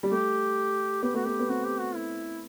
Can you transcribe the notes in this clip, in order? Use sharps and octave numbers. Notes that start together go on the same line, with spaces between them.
G3
A3 G4
B3 G4
A3 F#4
B3 G4
B3
C4 F#4
G4
F#4
E4